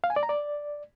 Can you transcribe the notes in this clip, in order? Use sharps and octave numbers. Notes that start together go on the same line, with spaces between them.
F5
G#5
D5
A#5
D5